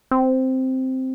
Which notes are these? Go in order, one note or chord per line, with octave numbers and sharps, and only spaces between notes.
C4